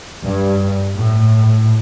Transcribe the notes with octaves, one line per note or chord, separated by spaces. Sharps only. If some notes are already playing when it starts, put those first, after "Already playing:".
G2
A2